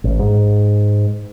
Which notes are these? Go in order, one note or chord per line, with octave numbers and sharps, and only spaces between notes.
A1
G#2